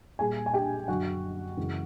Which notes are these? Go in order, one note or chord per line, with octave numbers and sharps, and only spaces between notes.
A#2 G3 G#4 G#5
G#5
G4 G5
F#2 D3 F#3 F#4 F#5
F#2 C#3 E3 G#3